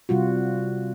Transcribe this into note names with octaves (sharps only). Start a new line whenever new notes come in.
C3 G3 F4 F#4